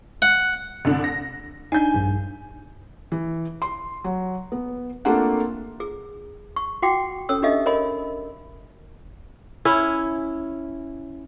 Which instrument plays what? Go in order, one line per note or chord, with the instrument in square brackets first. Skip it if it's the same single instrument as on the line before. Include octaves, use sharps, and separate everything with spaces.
[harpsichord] F#5
[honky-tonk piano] C2 D3 D4
A#6
[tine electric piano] D4 D#4 [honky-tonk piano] G#5 G6
[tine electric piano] A#1 G2
[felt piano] E3
C6
F#3
B3
A3 A#3 C4 D4 F4 F#5
[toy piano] G#4
C#6
F#4 F#5 G5 D6
C#4 A4 C#5 E6
D4 D#4 G4 A4 D#5 E5
A#4 C#5 D#5 G#5 B5
[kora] C#4 E4